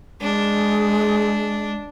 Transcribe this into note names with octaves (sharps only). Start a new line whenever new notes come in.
G#3 D4